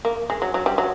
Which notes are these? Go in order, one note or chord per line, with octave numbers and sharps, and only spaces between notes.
A#3
G#3
F#3
F#3
G3
F#3